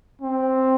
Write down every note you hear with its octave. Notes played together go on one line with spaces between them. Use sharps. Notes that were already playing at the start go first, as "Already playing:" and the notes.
C4